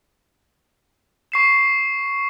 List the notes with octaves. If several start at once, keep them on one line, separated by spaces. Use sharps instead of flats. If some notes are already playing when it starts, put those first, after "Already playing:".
C#6 C7 E7